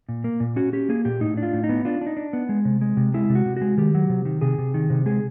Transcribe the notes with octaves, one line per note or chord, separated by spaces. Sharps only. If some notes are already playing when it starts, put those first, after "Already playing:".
A#2
A#3
A#2
C#4 F#4
C#4 G4
A#3 G#4
A#2 G4
A2 D#4
D4
F4
A2
D#4
B3
D4 F4
D4
D#4
D4
B3
G#3
C3
G#3
C3
G#3 E4
C3
F#4
C3
G#3 F#4
D#3 G4
F#3
C3
D#3
C3 G#4
C3
D#3
C3
G#3 G#4